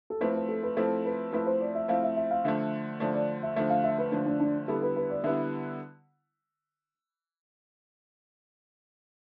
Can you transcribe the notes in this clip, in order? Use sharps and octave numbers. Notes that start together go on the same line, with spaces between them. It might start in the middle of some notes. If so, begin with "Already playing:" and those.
A4
F3 A3 C4 E4 B4
B4
A4
B4
F3 A3 C4 E4 A4
B4
F3 A3 C4 E4 B4
C5
D5
E5
F3 A3 C4 E4 F5
E5
E5
F5
D3 F3 A3 E5
D3 F3 A3 D5
D5
E5
D3 F3 A3 E5
F5
E5
B4
D3 F3 A3 D4
D4
D4
D3 G3 B3 E4 A4
B4
B4
D5
D3 G3 B3 E4 E5